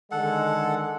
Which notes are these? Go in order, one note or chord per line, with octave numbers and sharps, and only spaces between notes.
D3 D#3 G#3 A4 F#5